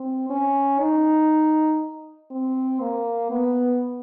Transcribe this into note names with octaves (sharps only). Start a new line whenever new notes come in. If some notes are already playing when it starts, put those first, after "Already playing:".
Already playing: C4
C#4
D#4
C4
A#3
B3